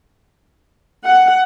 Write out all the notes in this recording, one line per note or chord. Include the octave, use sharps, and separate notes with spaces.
F#5